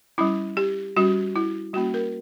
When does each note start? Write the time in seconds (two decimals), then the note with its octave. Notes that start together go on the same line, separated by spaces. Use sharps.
0.18 G3 C#4 E4
0.57 G4
0.97 G3 C#4 F#4
1.36 E4
1.73 G3 A#3 C#4 F#4
1.94 A#4